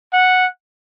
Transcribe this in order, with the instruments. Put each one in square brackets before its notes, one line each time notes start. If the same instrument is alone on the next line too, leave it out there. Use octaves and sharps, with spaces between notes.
[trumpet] F#5